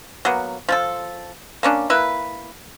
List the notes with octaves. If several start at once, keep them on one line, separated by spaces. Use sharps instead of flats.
F#3 A#3 B3
F3 F4 A4
A#3 C#4 D4
A#3 E4 B4